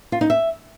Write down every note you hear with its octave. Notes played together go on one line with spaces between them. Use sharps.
F4
D#4
E5